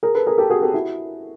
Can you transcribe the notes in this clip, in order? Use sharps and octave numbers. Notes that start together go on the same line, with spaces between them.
G#4 A#4
A4 B4
G#4 A#4
G4 A4
F#4 G#4
G4 A4
E4 F#4